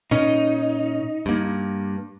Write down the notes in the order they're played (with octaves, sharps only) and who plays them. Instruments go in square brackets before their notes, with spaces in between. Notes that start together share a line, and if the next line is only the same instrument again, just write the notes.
[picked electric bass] A#2 C#4 [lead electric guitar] D#4
[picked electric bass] G2 A#3